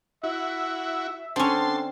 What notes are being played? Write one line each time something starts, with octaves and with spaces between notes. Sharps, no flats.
E4 F#4 E5
D3 C4 C#4 A5 C6